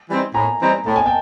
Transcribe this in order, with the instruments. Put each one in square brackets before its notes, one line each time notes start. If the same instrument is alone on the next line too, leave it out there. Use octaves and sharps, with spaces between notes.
[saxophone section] E3 G3 C4 D#4
[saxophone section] A2 [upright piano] G#5 A#5
[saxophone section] E3 G3 C4 D#4
[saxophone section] A2 [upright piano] A5
[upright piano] G#5
G5 A5